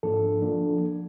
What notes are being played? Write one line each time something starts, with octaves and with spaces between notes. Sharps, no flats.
G#2 F3 A#3 D4 A4
F3 A#3 D4